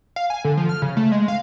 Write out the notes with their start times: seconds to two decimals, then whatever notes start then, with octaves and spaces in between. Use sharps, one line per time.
0.16 F5
0.30 G#5
0.45 D3
0.57 F3
0.69 F6
0.82 C#3
0.97 A3
1.12 G#3
1.28 F5